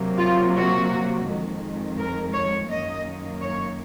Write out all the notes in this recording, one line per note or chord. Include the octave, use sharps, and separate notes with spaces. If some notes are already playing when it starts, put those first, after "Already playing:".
Already playing: C3 F#3 A#3
F4
F#4
F2 D#3 G#3
A#4
C#5
F#2 D#3 A#3 D#5
C#5